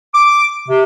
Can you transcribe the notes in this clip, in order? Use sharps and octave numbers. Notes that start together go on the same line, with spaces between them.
D6
C3